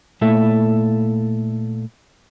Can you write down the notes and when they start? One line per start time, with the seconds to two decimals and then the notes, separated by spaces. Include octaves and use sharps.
0.21 A#2 A3 E4 A4 E5